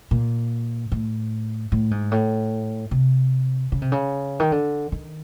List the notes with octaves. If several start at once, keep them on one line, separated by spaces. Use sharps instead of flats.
A#2
A2
A2
G#2
A2
C3
C#3
C3
C#3
D#3
D3
D#3